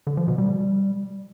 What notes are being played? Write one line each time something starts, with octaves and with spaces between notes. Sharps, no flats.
D3
F3
B2
G3